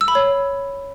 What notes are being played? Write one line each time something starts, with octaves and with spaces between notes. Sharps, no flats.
E6
B5
C#5